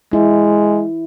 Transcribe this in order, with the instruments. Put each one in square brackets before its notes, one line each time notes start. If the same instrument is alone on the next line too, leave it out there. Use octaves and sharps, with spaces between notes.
[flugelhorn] G#3 [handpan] E4